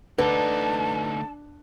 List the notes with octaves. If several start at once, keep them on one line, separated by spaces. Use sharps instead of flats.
D2 D3 D#4 B4 A5